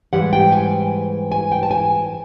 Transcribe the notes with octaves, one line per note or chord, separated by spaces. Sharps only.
G#2 E3 G3 F#5
G5
G#5
G#5
G5
A5
G#5